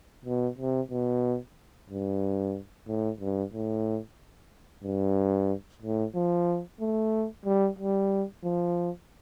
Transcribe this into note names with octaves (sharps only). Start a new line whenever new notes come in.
B2
C3
B2
G2
A2
G2
A2
G2
A2
F3
A3
G3
G3
F3